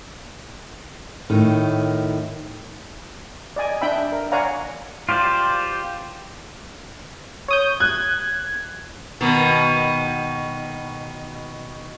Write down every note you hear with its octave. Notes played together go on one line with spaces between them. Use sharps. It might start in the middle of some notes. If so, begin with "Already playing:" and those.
A2 D#3
D5 D#5 G#5
D4 E5 G5 B5 E6
A#4
C#5 D5 F5 F#5 G#5 A#5
F4 G4 C5 D5
C#5 D#6 G6
F#6 G#6
B2 D#3